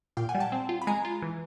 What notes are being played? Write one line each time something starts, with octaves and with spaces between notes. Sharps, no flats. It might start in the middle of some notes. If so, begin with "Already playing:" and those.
A#2 F5 G5
F#5 G#5
G3
G5 A5
C4
F4
B5
G#3 G#5 A#5
F4
E3